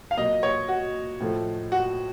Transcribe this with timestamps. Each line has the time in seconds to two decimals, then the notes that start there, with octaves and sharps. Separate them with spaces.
0.11 F5
0.17 A#2 F#3 A#3 D#5
0.43 C#5
0.68 F#4
1.20 A2 F3 A3
1.72 F#4